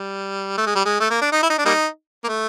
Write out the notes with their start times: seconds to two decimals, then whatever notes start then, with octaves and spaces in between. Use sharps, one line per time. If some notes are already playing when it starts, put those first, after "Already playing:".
Already playing: G3
0.57 A3
0.66 G#3
0.75 G3
0.85 G#3
1.00 A3
1.10 A#3
1.21 D4
1.32 D#4
1.43 E4
1.50 D#4
1.58 D4
1.65 G3 A#3 D#4
2.24 A#3
2.28 A3